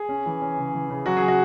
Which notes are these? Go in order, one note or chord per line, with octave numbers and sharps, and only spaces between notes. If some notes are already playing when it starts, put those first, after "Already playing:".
Already playing: G#4
C#4
E3
C#4
C#3
E3
C#3
F#3 F#4
G#4
F#3
F#4